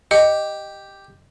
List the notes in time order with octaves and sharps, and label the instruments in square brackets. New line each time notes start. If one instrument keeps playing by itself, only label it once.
[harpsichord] G4 [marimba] D#5